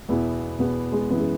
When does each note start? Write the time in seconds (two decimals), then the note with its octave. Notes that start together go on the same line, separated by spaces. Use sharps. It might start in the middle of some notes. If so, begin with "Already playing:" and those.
0.09 E2 B2 B3 E4
0.59 E2 B2 B3
0.92 G#3
1.10 F#2 E3 B3
1.19 G#3